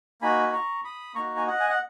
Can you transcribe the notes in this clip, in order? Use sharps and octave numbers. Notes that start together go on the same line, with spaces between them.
A#3 D#4 F#4 G#5 B5
B5
A#5 C#6
B5 D#6
A#3 D#4 F#4 A#5 C#6
G#5
D#5 F#5
G#5
F#5